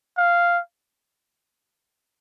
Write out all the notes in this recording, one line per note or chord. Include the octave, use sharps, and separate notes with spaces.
F5